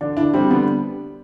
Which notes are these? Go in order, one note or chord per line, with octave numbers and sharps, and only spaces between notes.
D3 D4
D4 E4
G3 C4
D3 B3